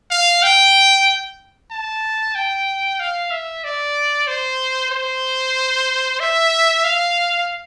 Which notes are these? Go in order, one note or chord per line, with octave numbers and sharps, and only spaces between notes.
F5
G5
A5
G5
F5
E5
D5
C5
C5
E5
F5